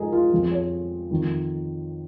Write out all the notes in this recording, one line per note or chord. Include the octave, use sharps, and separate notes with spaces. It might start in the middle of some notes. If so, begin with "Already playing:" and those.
Already playing: G#2 F3 G#4 A#4 D#5
F4
F2 F3 G#4
C#5
F2 D#3